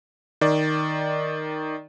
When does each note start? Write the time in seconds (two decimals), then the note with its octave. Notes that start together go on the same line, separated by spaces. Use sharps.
0.41 D#3 D5